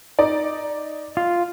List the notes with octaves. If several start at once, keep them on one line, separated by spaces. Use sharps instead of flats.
D#4 D5
F4